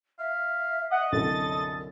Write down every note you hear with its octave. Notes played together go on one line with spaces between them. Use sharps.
E5 F5
D#5 F#5
C2 F#2 D3 A4 A6